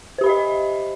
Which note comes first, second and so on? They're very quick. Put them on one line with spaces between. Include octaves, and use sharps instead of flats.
C5 G4 B5 E5 D#5